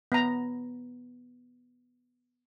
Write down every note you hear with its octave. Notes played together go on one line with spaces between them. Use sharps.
B3 A#5